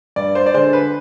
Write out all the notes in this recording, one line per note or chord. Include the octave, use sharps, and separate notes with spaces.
G2 D5
C5
D5
D3 G#3 C5
B4